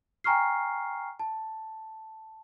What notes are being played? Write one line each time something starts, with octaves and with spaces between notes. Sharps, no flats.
G5 G#5 A#5 C#6 F6 C7
A5